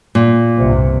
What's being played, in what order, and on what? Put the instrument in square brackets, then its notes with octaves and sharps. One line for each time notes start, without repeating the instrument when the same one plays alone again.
[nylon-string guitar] A#2
[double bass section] C2 G2 C3